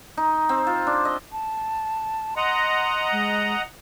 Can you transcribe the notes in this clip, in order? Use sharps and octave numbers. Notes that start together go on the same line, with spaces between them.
D#4
C4
F4
D4
D#5
A5
D#5 F#5 A#5 C6
G#3